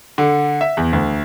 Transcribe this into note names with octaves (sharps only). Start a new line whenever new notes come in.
D3
E5
E2
D2